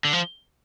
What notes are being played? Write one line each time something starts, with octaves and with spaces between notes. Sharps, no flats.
D3
F3